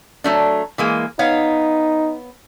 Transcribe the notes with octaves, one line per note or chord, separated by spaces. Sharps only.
F#3 A3 D4
E3 G#3 A#3
B3 D#4 C#5 F5